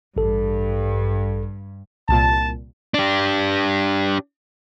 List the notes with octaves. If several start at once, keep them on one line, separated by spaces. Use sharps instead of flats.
A1 G2 A4
C2 A#2 A5
D4 G4